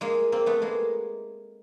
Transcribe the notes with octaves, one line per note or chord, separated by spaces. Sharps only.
G#3 A#3
A#3 C4
A3 B3
G#3 A#3